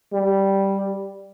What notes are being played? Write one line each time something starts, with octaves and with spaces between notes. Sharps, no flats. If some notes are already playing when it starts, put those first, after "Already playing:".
G3